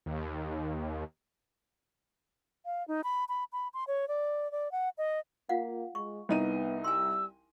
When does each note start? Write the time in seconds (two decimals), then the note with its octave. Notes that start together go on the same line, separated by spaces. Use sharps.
0.06 D#2
2.64 F5
2.88 D#4
3.04 B5
3.29 B5
3.53 B5
3.74 C6
3.88 C#5
4.08 D5
4.52 D5
4.72 F#5
4.98 D#5
5.49 A#3 F4 F5 F#5
5.95 G#3 C#6
6.29 C2 B3 D#4 D#7
6.84 G3 G#5 C6 E6